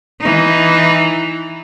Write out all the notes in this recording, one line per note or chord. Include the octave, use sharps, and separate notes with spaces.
E3 D#4